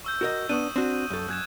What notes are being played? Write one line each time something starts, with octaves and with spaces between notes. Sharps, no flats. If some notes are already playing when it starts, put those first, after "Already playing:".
C#6 E6 G6
F#4 A#4 D#5
B3 D4 C#6 D#6 D#7
C4 D4 F#4
F#2 A4
F#2 F#6 G#6 E7